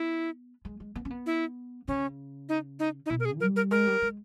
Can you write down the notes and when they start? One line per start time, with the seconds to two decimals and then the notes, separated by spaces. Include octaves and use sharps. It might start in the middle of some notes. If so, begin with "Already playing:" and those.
Already playing: B3 E4
0.65 G#3
0.80 G#3
0.95 B3
1.05 C#4
1.10 B3
1.26 E4
1.88 C#3 C#4
2.49 D#4
2.79 D#4
3.06 D#4
3.10 B2 E4
3.20 A#4
3.25 G#4
3.40 G3 A#4
3.56 A#4
3.71 G#3 A#4
3.87 G3
4.02 G#3